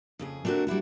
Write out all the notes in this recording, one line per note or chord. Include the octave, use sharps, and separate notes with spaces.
F2 C#3 G#4
A3 C4 D4 F#4 A#4
G3 D4 E4 F#4